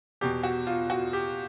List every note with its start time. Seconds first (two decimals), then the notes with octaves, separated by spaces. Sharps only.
0.21 E2 B2 G4
0.43 F#4
0.67 F4
0.90 F#4
1.13 G4